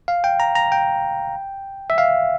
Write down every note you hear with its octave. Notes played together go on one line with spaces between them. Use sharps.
F5
G5
A#5
A#5
G5
E5
F5